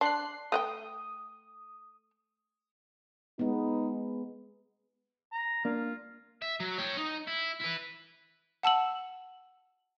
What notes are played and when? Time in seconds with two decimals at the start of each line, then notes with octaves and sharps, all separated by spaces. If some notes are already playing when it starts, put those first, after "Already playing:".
0.01 D4 C6 F#6 C7
0.52 A3 F#5 G5 D#6
3.39 G#3 B3 D#4
5.32 A#5
5.65 A#3 D4 F4
6.42 E5
6.60 F#3
6.78 C#5 G5
6.97 D#4
7.27 E4
7.60 E4 B4
8.63 F#5 A5 E6 F#7